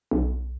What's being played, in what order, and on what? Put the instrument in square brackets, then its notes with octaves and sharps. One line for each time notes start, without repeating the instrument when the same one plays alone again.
[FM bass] B1